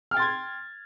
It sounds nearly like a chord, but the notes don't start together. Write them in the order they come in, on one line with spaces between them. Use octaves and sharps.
F6 G5 A6 C6 G#6